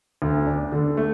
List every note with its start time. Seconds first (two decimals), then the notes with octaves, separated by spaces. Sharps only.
0.22 D2
0.47 D4
0.72 D3
0.97 A3